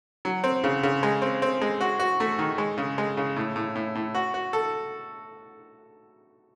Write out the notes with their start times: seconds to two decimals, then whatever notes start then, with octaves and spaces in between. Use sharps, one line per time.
0.25 F#3
0.44 C4
0.64 C#3
0.83 C#3
1.03 G#3
1.22 C4
1.42 C4
1.62 G#3
1.81 F#4
2.00 F#4
2.20 A3
2.39 D#3
2.58 G#3
2.78 C#3
2.98 G#3
3.17 C#3
3.36 A2
3.56 A2
3.75 A2
3.95 A2
4.15 F#4
4.34 F#4
4.53 A4